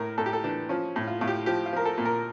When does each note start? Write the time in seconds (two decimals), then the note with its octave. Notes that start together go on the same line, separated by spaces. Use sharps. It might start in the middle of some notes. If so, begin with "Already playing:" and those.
Already playing: A2 A#4
0.18 A2 A4
0.26 G4
0.33 A4
0.44 E3 D4
0.69 F3 C#4
0.96 A2
1.08 F4
1.21 A2 F4
1.28 G4
1.46 F3 G4
1.66 F4
1.73 F3 A#4
1.85 A4
1.98 A#2
2.05 A#4